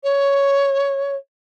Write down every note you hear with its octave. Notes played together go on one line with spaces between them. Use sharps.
C#5